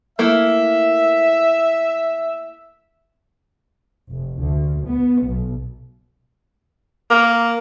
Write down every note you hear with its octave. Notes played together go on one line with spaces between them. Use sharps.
A3 A#3 E4 E5
F1
D2
B3
B1
A#3